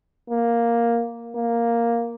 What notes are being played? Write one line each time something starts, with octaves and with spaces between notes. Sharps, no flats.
A#3
A#3